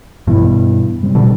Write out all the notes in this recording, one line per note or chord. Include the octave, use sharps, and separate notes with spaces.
G2 B2 E3 B3 E4
C3 G3 C4
B2 D3